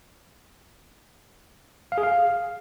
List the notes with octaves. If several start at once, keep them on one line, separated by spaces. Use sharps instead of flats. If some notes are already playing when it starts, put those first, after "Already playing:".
F5
G#4
F5